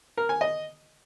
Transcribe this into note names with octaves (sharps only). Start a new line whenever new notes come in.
A#4
G#5
D#5